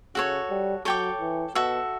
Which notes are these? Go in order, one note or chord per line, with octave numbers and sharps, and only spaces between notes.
C#3 F#4 A4 C#5
G3
F#3 A4 C#5 G5 D6
E3
B2 F#4 A4 E5